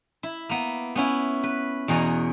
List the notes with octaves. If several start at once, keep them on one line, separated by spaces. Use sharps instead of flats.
E4
A#3 B3
B3 C#4 E4
B4
E2 B2 G#4 A#5